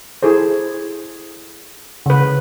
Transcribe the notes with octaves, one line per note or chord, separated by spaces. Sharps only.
E4 G#4 A4 C5
C#3 B4